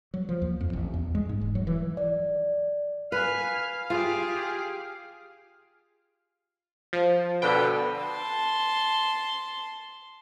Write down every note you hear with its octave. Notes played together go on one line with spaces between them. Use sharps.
F#3
F3
D#2
F2
A1
E2
G#3
G#2
E1
F#3
E3
D5
B4 F5 G#5 F6
F4 G4 G#4
F3
B2 D3 B4 G5
A5 C6